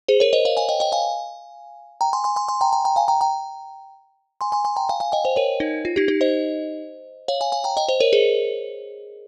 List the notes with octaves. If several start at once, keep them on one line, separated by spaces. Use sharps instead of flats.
G#4 C5
A#4 C#5
C5 D#5
C#5 F5
F5 G#5
D#5 G5
D#5 G5
F5 G#5
G5 A#5
G#5 C6
G#5 C6
G#5 C6
G#5 C6
G5 A#5
G5 A#5
G5 A#5
F5 G#5
G5 A#5
G5 A#5
G#5 C6
G#5 C6
G#5 C6
G5 A#5
F5 G#5
F5 G#5
D#5 G5
C5 D#5
A#4 C#5
D#4
F4
D#4 G4
D#4 G4
C5 D#5
C#5 F5
F5 G#5
F5 G#5
G5 A#5
D#5 G5
C5 D#5
A#4 C#5
G#4 C5